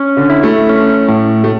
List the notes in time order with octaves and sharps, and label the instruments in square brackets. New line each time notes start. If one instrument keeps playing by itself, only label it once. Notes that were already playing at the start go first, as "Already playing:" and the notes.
Already playing: [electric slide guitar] C#4
[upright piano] D3
[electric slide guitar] E4
[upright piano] A3
[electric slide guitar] C#4
A2
[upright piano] A3